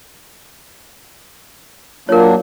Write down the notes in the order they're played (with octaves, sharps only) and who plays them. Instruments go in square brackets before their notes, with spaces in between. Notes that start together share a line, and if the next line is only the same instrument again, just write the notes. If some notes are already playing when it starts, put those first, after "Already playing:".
[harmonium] F#3 A#3 D4 [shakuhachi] F4 [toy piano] A#4 C#5